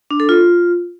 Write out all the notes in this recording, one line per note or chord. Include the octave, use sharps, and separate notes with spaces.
D4
A4
F4